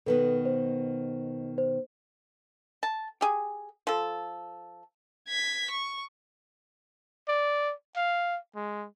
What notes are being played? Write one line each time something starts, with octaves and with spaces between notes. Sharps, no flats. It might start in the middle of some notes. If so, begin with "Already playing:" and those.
B2 D#3 B3 A4 B4
C5
C5
A5
G4 G#4
F3 A4
G#6 B6
C#6
D5
F5
G#3